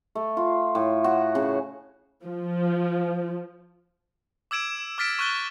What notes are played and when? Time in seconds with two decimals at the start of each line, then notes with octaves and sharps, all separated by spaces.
0.15 A3
0.37 F4
0.75 A2
1.04 F#4
1.35 C#3
2.24 F3
4.51 D6 E6 G#6 D7 E7
4.98 D6 F6 A6 B6 D7 E7
5.19 C#6 F6 F#6 A6 G7